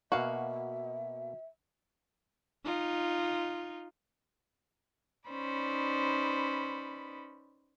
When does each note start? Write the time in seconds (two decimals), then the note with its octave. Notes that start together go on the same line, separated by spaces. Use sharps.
0.12 B2 A#3 F#4 E5 F5
2.64 D#4 F4
5.29 C#4 D#4 B4 C5 D5 B5